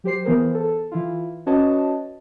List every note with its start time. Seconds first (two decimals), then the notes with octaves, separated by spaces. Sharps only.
0.04 F#3 G4 C5 C7
0.24 E3 B3 G#4 A#4 C5
0.54 A4
0.91 E3 E4 F4
1.46 C#4 F#4 B4 C#5 D#5 A5